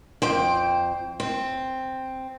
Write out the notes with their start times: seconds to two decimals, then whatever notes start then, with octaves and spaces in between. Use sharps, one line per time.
0.22 F2 C5 G5
1.20 C4